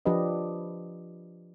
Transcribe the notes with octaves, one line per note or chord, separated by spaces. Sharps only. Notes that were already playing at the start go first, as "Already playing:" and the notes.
F3 D4 G4 B4 D#5